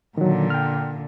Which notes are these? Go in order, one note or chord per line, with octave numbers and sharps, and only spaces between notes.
A#2 D3 D#3 F#3
G5 F6